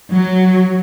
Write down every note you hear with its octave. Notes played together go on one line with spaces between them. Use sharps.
F#3